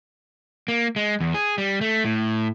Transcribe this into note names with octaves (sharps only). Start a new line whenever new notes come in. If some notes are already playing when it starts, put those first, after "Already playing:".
A#3
G#3
E2
G#4
G3
A3
A2